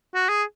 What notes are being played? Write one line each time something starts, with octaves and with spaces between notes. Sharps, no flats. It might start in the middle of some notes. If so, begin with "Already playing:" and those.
F#4
G#4